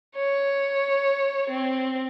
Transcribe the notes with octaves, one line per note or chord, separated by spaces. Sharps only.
C#5
C4